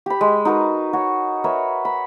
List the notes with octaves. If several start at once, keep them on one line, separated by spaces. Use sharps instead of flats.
G4 B5
G#3
D#4 F#4 A#4 B4
F#4 C#5
A#4 B4 C#5 E5
B5